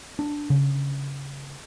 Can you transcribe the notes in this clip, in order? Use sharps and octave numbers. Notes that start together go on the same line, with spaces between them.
D4
C#3